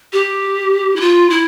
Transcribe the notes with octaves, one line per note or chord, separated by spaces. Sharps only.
G4
E4
F4
E4